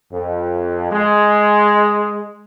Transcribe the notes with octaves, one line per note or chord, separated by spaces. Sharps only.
F2
G#3